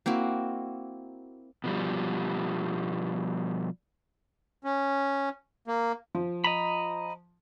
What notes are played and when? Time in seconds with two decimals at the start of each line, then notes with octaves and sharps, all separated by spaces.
0.06 A#3 C4 E4 F#4
1.64 B2 F3 G3
4.64 C#4
5.68 A#3
6.15 F3
6.44 D#5 A#5 B5